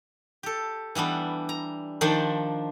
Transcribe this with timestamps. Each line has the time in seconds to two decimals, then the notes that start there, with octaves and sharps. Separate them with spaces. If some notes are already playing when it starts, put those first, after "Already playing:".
0.43 G4 A4
0.95 E3 G3 B3 D4
1.49 A#5
2.01 D#3 F3 D4 C5 D5